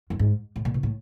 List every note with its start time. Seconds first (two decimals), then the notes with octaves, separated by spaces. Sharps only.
0.10 F#2
0.19 G#2
0.56 A2
0.65 A#2
0.74 B2
0.83 A2